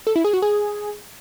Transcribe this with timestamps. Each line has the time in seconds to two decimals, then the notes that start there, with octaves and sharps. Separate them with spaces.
0.07 A4
0.16 E4
0.25 G#4
0.33 F#4
0.42 G#4